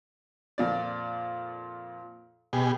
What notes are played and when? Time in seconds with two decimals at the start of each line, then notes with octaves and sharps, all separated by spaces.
0.58 F2 A#2 D5
2.53 B2 G4 G#4